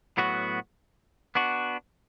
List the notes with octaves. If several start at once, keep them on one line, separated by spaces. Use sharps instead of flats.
A2 F#3 B3 F#4
B3 D4 F#4